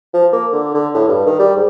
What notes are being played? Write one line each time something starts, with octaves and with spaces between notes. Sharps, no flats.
F3
A#3
D3
D3
A2
G2
D#3
G3
G#2